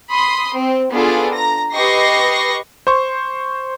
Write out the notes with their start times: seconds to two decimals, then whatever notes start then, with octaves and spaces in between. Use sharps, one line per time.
0.10 B5 C6 D#6
0.58 C4
0.91 B3 D4 F4 G#4 A4
1.34 A#5 A#6
1.73 G4 B4 D#5 C#6 A#6 C7
2.87 C5 C6 C#6